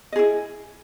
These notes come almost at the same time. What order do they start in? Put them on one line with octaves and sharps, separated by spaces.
D#5 G#4 E4